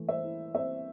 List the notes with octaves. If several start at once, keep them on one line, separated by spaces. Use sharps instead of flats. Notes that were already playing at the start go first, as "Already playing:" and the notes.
Already playing: E3 A3
C5 E5
E4
C4 C5 E5